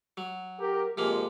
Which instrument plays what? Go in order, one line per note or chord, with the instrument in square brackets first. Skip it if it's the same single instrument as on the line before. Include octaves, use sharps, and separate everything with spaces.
[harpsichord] F#3
[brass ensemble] G4 A#4
[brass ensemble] F2 G#3 [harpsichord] C3 F3 A#3